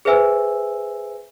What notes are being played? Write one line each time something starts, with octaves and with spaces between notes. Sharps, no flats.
G#4 B4 C5 E5 G#5 E6